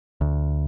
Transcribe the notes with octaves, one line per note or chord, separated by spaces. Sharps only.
D2